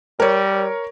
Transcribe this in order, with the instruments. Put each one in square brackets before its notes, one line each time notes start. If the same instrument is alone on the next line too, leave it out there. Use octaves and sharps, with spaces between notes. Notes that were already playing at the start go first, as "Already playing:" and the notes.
[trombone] G3 [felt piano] A#4 C#5